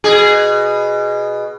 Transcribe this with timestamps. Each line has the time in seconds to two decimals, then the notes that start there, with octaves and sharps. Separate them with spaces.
0.04 B2 G#4